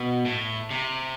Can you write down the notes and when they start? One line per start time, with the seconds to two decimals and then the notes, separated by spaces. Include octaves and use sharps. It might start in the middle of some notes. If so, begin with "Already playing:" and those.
Already playing: B2
0.25 A2
0.71 C3